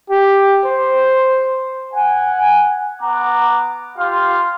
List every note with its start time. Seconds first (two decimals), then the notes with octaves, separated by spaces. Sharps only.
0.10 G4
0.65 C5
1.93 F#5 G#5
3.01 B3 F#5 A#5 D6
3.98 F4 G4 F5 C6